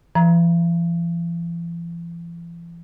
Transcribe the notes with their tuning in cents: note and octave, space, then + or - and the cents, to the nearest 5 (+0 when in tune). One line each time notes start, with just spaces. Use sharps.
E3 +45 A#5 +15